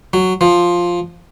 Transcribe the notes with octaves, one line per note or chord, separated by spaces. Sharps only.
F#3
F3